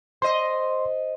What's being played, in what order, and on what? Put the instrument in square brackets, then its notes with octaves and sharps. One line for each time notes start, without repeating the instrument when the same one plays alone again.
[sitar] C5 D#5 [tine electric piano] C6